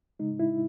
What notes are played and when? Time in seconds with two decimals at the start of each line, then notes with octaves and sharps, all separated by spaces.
0.19 C#3 G#3 D#4
0.40 E4